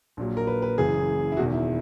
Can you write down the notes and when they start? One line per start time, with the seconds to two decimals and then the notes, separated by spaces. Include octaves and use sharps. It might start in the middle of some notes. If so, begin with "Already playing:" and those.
0.17 A#1 A#2 F#3
0.37 A#4
0.47 B4
0.62 B4
0.78 F#1 F#2 C#3 E3 G#4
1.32 E4
1.37 E1 E2 D#3 F#4
1.52 E4